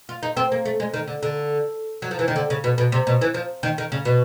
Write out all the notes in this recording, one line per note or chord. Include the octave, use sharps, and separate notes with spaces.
F4
D#4
C4
A#3
A3
G#3
D#3
D3
D3
F#3
F3
E3
D#3
D3
C#3
B2
B2
C3
B2
E3
F3
D#3
D#3
C#3
B2